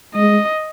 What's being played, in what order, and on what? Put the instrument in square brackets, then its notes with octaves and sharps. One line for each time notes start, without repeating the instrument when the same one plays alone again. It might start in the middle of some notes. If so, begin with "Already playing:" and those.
[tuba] G#3 [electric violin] D#5